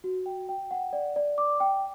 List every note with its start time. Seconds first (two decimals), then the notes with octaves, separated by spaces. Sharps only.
0.04 F#4
0.26 G5
0.49 G5
0.71 F#5
0.93 D5
1.16 D5
1.38 D6
1.60 G5